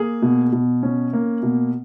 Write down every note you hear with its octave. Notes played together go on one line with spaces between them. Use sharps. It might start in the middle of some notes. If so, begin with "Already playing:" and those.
Already playing: A#3 G#4
B2
B2
C#4
A#3
B2